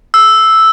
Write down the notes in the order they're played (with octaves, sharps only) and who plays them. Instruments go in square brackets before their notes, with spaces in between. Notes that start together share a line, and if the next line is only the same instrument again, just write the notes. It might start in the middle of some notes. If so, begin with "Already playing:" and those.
[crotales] E6